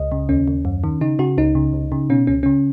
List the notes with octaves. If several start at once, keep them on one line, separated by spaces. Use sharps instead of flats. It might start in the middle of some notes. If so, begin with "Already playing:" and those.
Already playing: C#2 D#5
C#3
D#2 C#4
D#2
F#2
D#3
C#3 D#4
C#3 F#4
C#2 D#4
C#3
C#2
C#3
B2 C#4
C#2 C#4
C#3 C#4